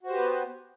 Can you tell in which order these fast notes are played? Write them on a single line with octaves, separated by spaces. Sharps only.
F#4 C5 G4 B4 B3